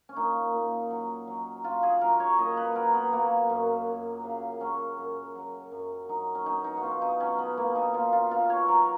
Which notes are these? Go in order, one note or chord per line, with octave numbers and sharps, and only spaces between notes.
C#4
A#2 D#4
A#2
F#3
F#3
F#3 F4
G#4
F#3 A#4
C#5
A#2 D#5
B4
F#3 A#4
B3
F#3 A#3
F#2
F#2
C#3
F#3 C#4
F#2
F#3
F#2
F#3 D#4
C#4
B2 D#4
D#4
F#4
B2 F4
D#4
F#3 C#4
B3
B2 A#3
D#4
B2 F4
F4
B2 F4
C#5
F#3 A#4